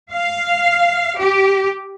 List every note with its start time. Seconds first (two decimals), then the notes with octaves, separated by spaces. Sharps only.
0.12 F5
1.18 G4